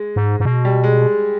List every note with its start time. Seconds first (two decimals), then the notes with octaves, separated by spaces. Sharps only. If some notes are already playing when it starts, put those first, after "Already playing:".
Already playing: G#3
0.16 G#2
0.40 G#2
0.45 B2
0.65 G3
0.84 G#3